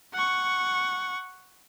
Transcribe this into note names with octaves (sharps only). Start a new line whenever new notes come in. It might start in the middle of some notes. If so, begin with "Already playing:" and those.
F#5 C#6